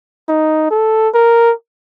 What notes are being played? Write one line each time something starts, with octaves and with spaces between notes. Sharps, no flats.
D#4
A4
A#4